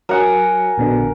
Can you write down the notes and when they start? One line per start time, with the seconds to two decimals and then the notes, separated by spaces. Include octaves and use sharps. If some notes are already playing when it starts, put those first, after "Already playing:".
0.09 F#3 A#4 F#5 G#5
0.78 A#1 B2 D3